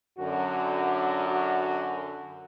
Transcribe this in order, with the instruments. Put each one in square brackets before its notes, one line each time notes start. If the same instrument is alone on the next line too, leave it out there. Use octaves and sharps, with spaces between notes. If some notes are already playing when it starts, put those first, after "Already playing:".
[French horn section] F#2 D3 [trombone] F#4
[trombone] F#4